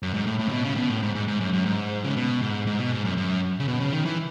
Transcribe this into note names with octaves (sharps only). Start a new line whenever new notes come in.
F#2
G#2
A2
A2
C#3
B2
C#3
A2
B2
A2
G#2
G#2
G#2
F#2
F#2
G#2
C#3
B2
G#2
G#2
B2
G#2
F#2
F#2
C#3
B2
C#3
D#3
E3